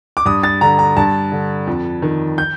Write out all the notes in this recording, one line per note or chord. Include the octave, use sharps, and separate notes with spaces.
D6
G2 D#6
A6
D3 A#5
A#5
G2 A5
D3
F2
D#3
G6